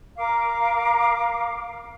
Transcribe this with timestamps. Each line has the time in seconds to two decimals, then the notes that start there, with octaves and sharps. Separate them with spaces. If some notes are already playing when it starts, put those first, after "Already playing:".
0.17 A#4 F5 D6